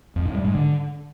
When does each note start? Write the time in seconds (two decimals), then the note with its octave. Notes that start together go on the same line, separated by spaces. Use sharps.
0.16 F2
0.25 A2
0.35 G3
0.44 G#2
0.54 D3